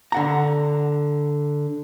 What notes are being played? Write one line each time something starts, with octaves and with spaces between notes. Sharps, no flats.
D3 F#5 A#5